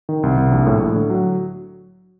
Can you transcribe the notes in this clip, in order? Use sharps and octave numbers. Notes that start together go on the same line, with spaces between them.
D#3
C2
C2
A#1
A2
A2
D3
F#3